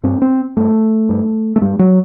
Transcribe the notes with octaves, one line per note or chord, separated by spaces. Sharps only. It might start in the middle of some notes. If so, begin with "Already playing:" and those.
G2 C4
C4
G2 A3
G2
A3
G2 G3
F#3